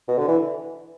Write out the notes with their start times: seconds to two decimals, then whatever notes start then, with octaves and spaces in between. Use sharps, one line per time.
0.08 B2
0.18 D3
0.28 E3